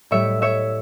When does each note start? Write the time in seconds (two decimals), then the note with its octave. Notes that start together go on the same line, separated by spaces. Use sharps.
0.11 A2 G3 C#5 E5
0.42 C#5 E5